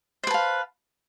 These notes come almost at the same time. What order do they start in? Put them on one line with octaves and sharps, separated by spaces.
C5 B4 A5 F5